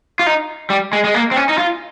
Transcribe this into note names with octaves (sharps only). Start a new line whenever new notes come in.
F4
D#4
G3
G#3
G#3
A#3
C4
C#4
D#4
F4